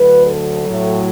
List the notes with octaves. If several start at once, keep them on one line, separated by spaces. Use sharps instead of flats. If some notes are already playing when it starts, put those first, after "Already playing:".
Already playing: D2 D3 F#3 B4
A4
A2 F#3